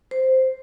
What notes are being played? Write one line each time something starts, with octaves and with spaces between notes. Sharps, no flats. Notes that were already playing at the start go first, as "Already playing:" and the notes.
C5